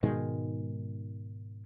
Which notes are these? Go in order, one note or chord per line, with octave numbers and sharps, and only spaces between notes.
G#2 B2 D#3 G#3